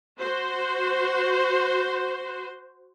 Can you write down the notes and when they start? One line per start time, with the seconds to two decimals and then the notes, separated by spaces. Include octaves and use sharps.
0.19 F#4 C5